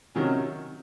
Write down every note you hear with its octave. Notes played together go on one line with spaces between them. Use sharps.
C3 D#3 F#3 C#4